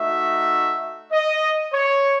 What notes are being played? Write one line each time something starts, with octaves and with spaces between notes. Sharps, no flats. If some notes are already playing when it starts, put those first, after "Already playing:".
Already playing: A3 D#4 F#4 E5
D#5
C#5